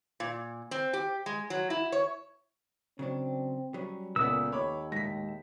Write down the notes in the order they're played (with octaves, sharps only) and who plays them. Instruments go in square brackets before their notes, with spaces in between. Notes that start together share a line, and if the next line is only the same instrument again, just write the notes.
[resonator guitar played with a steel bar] A#2
C4
G4
G#3
F#3
E4
C#5
[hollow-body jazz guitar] C#3 F#3 D4 [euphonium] C4
[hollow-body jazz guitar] F#3 G3 C#4
[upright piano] C#2 B3 [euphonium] A#2 [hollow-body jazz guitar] A3 B4 [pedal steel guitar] E6
[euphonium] D#2 [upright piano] C#5 B5 D6
[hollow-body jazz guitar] A2 G#3 [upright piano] A#6 B6